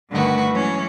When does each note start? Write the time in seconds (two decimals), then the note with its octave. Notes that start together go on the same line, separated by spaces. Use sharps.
0.10 G2 D3 D#3 A3 F#4 B4
0.51 E3 F#3 G#3 C#4